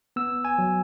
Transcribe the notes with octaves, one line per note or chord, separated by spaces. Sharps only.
B3 E6
G#5
F#3